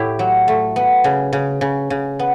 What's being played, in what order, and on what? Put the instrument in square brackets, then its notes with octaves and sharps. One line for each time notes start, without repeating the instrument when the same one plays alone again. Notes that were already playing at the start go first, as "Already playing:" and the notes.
Already playing: [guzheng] A2 E4 G4
F#3
A3
B3
C#3
C#3
C#3
C#3
B3